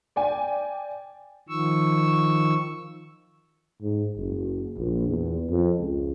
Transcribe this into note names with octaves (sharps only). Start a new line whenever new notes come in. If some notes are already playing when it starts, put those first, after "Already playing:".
D5 G5 G#5
D#3 F3 C#6 E6
G#2
F#1
A#1
E2
F2
C#2